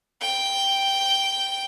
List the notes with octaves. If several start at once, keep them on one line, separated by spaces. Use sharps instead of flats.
G5